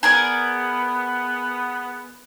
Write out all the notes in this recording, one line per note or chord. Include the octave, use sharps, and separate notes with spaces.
B3 G#4 A#4 D5